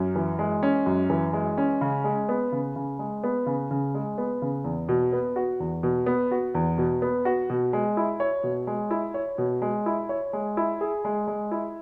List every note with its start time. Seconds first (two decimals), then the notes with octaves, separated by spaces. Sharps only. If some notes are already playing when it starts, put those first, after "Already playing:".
Already playing: F#2 C#4
0.15 E3
0.39 G#3
0.63 C#4
0.86 F#2
1.10 E3
1.33 G#3
1.58 C#4
1.81 C#3
2.04 G#3
2.29 B3
2.52 C#3
2.76 C#3
2.99 G#3
3.23 B3
3.46 C#3
3.71 C#3
3.95 G#3
4.18 B3
4.42 C#3
4.64 E2
4.89 B2
5.12 B3
5.36 F#4
5.60 E2
5.83 B2
6.06 B3
6.31 F#4
6.55 E2
6.78 B2
7.02 B3
7.25 F#4
7.50 B2
7.73 G#3
7.97 E4
8.20 C#5
8.44 B2
8.67 G#3
8.91 E4
9.14 C#5
9.38 B2
9.62 G#3
9.86 E4
10.09 C#5
10.33 G#3
10.57 E4
10.81 G#4
11.05 G#3
11.27 G#3
11.51 E4